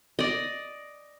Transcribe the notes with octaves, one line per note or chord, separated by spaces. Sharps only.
D5 D#5